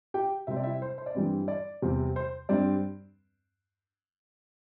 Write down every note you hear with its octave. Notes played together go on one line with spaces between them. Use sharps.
G4 G5
C3 G3 C4 E5
D5
E4 E5
C5
C5
D5
G2 E3 G3 C4
D5
E2 C3 G3 C4
C5
G2 G3 C4 D5